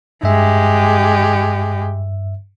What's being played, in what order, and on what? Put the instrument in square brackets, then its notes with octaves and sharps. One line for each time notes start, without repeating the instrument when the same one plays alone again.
[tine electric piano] G2 E5 [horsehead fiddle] G#3 G4